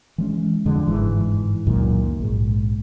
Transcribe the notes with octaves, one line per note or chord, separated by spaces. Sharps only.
E3 G#3 C#4
F2 D3 G#3
G1 G#2 E3
C#2 F#2 A#2 D#3
A#1 G#2